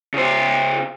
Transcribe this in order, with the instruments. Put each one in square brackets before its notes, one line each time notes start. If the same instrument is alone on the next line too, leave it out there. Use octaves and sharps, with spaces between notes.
[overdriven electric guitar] C#3 C5